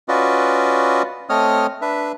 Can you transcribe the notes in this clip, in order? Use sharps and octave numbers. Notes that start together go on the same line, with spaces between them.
C#4 F4 F#4 B4 D5 D#5
A3 C4 C#5 D#5 D#6 F6
D4 B4 E5